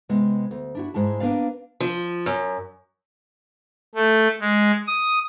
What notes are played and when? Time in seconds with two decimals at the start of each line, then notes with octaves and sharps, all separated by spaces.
0.09 C3 G#3 B3
0.51 D2
0.75 D4 E4 F#4
0.94 G#2 G#3 E4 A5
1.20 A#3 B3 D4 B4 D5 F5
1.80 F3
2.26 F#2
3.95 A3
4.41 G#3
4.87 D#6